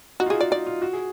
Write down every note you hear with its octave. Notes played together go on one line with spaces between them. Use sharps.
D#4 F#4
F4
F#4 G#4
F#4 D5
D#4 D5
F4
F#4
G#4